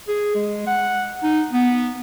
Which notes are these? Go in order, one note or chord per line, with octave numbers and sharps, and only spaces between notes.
G#4
G#3
F#5
D#4
B3